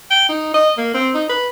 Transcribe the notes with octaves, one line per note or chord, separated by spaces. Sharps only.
G5
D#4
D#5
A#3
C4
D#4
B4